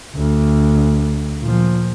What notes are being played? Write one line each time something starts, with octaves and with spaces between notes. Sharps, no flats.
D2
A#2 F3